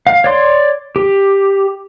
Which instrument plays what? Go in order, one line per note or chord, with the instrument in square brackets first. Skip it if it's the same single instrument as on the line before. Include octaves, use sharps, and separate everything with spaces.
[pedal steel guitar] F5
C#5 D5 C6
G4